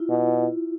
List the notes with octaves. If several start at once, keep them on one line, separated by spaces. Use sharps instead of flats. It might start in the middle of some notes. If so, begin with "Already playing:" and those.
Already playing: E4 F4
B2